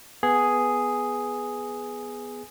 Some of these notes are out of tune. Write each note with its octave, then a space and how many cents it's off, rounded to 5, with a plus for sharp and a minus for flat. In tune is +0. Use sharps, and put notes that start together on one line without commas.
B3 +0 G#4 +0